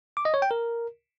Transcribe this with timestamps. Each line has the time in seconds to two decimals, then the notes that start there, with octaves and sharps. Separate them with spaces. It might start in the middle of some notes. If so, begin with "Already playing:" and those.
0.17 D6
0.25 D#5
0.34 C#5
0.42 G5
0.51 A#4